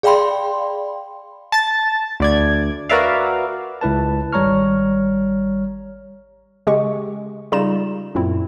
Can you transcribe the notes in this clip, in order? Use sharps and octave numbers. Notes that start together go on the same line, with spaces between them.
G#4 D5 F5 G5 B5 C6
A5 A6
D2 D5 G#6
F#4 A#4 B4 D5 E5 F5
C#2 E4 B4 A5
G#1 G3 C#5 A#5 C#6 F6
C#3 G#3 G4 C#6
C#3 G3 D#4 F4 A#5 E7
F#2 A#2 C4 E4